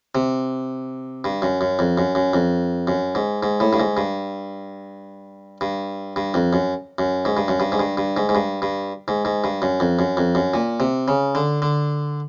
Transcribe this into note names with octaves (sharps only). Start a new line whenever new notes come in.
C3
G2
F#2
F#2
F2
F#2
F#2
F2
F#2
G#2
G#2
A2
G2
G#2
G2
G2
G2
F2
F#2
F#2
G#2
G2
F#2
G2
G#2
G2
G2
G#2
G#2
G2
G2
G#2
G#2
G2
F#2
F2
F#2
F2
F#2
A#2
C3
C#3
D3
D3